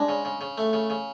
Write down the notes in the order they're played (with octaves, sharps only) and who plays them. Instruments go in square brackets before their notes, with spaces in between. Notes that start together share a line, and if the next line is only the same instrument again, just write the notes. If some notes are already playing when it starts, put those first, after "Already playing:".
Already playing: [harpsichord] G#3 [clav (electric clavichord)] D4
[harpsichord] C#3
C#3
C#3
A3
C#3
C#3